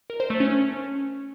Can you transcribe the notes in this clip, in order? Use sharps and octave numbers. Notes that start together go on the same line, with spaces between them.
A#4
C5
A3
C#4